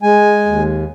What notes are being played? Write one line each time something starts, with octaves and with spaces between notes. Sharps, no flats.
G#3 G#5
D#2